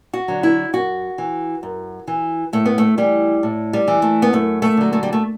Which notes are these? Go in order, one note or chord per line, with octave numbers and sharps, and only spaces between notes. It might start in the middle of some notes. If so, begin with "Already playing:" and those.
F#4
D3 F#3
E4
F#2 F#4
E3
F#2
E3
A2 A3
B3
A3
E3 G3
A2
G3
E3
A3
B3
F#2 A3
A3
D3 F#3
A3
G3
A3